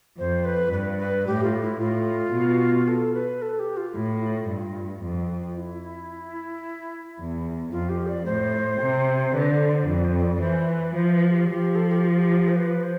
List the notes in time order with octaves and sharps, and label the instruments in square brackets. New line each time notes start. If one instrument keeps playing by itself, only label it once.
[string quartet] F2 [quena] C5
[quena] B4
[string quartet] G2 [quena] B4
[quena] B4
[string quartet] A2 [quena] G4
[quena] F4
E4
[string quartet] A2 [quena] F4
[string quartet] B2
[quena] A4
B4
A4
G4
F4
[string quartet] A2 [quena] E4
[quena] F4
[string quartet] G2
F2
[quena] E4
[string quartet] E2
[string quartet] F2 [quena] F4
[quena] G4
D5
[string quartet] A2 [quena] C5
[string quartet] C3
[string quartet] D3 [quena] B4
[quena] C5
C5
[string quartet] F2 [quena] D5
[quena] C5
C5
D5
D5
[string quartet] E3 [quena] C5
[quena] B4
[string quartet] F3 [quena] C5
[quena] B4
G4
[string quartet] F3 [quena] G4
[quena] A4
G4
F4
G4
C5
B4
C5